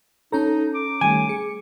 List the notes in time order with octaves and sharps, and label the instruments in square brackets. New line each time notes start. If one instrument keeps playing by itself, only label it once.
[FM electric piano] C#4 C#5 A#5 [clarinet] D#4 [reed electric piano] A4
[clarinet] D6
[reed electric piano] D#3 G3 A3 [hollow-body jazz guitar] G#5
[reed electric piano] G#4 [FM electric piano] C#7